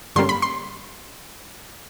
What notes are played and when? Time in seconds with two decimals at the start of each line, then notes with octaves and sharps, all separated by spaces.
0.16 G2 D3 G3 A#3 C#4 C6
0.29 B5
0.42 C6